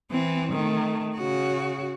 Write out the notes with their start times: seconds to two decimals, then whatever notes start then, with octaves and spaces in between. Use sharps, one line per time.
0.11 E3 C4
0.52 D#3 A3
1.16 C#3 F#4